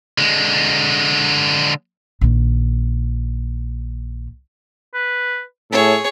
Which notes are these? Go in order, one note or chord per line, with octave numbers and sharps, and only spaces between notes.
D3 G#3
A#1 D#3
B4
A2 G#4 A4 C#5